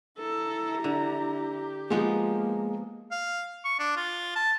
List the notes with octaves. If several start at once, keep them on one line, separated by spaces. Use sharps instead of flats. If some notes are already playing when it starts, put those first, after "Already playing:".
E4 A4 A#5
D3 G4
F3 G#3 A#3 B3 D#4
F5
C#6
D4
F4
A5